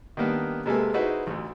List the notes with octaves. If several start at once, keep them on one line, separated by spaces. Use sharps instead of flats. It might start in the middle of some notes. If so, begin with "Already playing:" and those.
D#3 G3 A#3 B3 D4
C3 G#3 A#3 A4 B4 G#5
D#4 E4 F#4 G#4 B4 C5
A1 D2